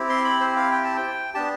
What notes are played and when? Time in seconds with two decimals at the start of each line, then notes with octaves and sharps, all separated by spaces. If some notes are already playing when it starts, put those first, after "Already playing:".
Already playing: C4 E4 G4
0.09 C6
0.24 B5
0.41 C5
0.56 F5
0.72 G5
0.84 A5
0.96 G5
1.34 B3 D4 G4 A5